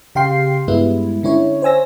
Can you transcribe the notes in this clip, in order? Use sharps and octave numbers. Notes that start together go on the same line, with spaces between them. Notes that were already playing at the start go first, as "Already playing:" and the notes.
C#3 G4 F5 G5 C6 C7
G2 G3 G#3 B3 E4
D3 C#4 E4 C#5
C5 C#5 G#5 E6 A#6